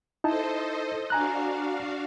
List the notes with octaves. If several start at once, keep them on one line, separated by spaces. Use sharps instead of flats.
D#4 E4 A4 C5 D#5 A5
D4 F#4 F5 G#5 A#5 F#6